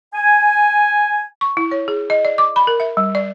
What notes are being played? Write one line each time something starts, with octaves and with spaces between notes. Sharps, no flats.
G#5
C#6
E4
C#5
G#4
D#5
D5
D6
B5
A#4
E5
G3
D5